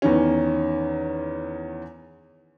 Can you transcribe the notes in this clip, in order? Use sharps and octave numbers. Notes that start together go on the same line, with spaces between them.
E2 D#3 C#4